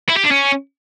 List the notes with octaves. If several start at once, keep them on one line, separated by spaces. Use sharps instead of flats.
E4
G4
D4
C#4